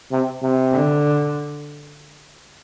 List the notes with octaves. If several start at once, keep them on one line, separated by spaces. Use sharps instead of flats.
C3
C3
D3